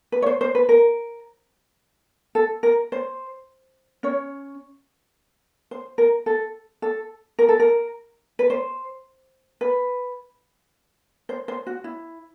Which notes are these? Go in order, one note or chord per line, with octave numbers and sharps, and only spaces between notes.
B4
C#5
C5
C5
B4
A#4
A4
A#4
C5
C#4 C#5
C5
A#4
A4
A4
A#4
A4
A#4
B4
C5
B4
C5
C5
F#4
E4